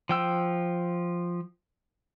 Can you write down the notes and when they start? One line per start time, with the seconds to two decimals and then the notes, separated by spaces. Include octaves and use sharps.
0.09 F3 G5 E6